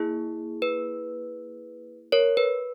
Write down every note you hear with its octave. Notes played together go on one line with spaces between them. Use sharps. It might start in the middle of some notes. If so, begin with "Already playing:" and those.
Already playing: A#3 E4 G#4
B4
A#4 C#5
B4